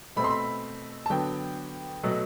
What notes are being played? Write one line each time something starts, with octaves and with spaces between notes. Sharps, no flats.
B2 A3 C4 B5
C6
B5
A5
D3 F#3 B3 G5
B2 F#3 A3